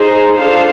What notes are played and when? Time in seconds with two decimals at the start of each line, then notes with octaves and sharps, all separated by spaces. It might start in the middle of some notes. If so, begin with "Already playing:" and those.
Already playing: D#4 G#4 C5
0.36 D4 F4 A4 C5 F5